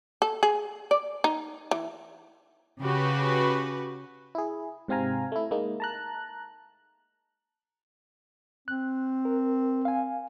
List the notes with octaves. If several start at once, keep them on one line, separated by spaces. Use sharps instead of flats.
A4
G#4
D5
D#4
E3
C#3 F#4 G4 B4
E4 G#4
G#2 C3 C4 F5 G#5 A#5
A3 E4
G#3 A#3 D#4
A5 A#5 F#6
C4 F#6
A#4
F5 G#5